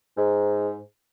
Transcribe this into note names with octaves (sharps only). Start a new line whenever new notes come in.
G#2